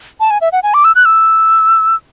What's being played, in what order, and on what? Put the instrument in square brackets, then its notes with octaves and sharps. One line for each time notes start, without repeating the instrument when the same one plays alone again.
[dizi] A5
G#5
E5
F#5
G#5
D6
E6
F#6
E6